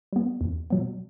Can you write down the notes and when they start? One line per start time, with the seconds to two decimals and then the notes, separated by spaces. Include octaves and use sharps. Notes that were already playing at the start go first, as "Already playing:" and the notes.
0.13 G3 B3
0.41 E2
0.70 B2 F#3 B3